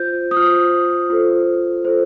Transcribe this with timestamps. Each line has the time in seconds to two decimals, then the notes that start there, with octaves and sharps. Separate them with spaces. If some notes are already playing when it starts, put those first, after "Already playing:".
Already playing: F4 C5 G6
0.31 D#6
0.37 F4 C5 F6
1.10 F4 A4 C5
1.85 F4 A4 C5